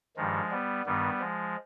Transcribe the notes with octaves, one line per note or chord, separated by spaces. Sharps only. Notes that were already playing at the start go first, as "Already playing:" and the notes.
G2 D#3 F3 G#3
G3 B3
G2 D#3 G3 B3
F3 G#3